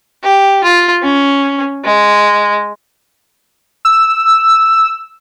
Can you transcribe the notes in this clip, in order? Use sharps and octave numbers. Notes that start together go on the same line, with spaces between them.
G4
F4
C#4
G#3
E6